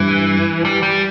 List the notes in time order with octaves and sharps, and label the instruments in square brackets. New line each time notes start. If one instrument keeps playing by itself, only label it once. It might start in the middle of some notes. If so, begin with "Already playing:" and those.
Already playing: [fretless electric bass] G2 [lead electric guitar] E3
[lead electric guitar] G3
G3